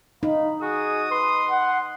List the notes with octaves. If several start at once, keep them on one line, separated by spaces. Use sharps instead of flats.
D#4 F5 B5
F#4 G#4 D#6
B4 C6
F#5